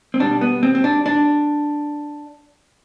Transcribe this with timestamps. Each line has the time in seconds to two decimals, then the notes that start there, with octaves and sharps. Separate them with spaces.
0.14 C4
0.20 B2 G3 D4
0.41 B3
0.63 C4
0.75 C4
0.84 D4
1.06 D4